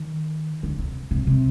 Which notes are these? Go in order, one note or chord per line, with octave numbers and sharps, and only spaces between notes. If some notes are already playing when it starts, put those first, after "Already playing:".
Already playing: D#3
D3
C3
C3
C3